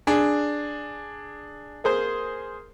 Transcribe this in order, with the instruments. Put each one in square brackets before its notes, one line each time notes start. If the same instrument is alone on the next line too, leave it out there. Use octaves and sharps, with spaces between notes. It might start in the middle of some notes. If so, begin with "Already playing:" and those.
[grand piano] D4 G#4
[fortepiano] A#3 G#4 C5